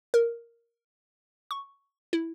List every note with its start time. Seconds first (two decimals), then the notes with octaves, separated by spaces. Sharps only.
0.14 A#4
1.51 C#6
2.13 E4